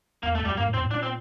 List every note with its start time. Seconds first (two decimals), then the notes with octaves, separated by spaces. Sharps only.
0.23 E2 A#3
0.35 A3
0.40 F2
0.45 G3
0.51 F2
0.57 G2 A#3
0.66 A2
0.74 F2 C4
0.82 A2
0.91 A#2 D4
1.03 C4